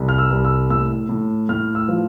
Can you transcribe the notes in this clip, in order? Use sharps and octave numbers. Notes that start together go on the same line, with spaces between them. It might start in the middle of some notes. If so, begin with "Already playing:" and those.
Already playing: C2
F6
E6
C2
E6
A2 E6
A2
A2 F6
E6
F3